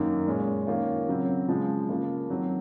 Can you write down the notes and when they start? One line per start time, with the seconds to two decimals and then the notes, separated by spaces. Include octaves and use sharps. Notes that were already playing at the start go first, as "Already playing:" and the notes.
Already playing: F#2 D#3 A#3 D#4
0.26 A#2 G#3 C#4
0.67 D#3 A#3 C#4 F4
1.08 C#3 F#3 C4
1.48 C#3 F3 G#3
1.89 C#3 F3 A#3 F4
2.30 D#3 F#3 C4